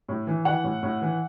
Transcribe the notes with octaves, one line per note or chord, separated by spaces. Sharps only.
A2
E3
E3 F#5
A2
A2
E3